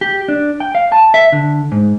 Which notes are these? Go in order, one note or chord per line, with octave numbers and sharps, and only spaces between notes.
G4
D4
G5
F5
A5
E5
D3
G#2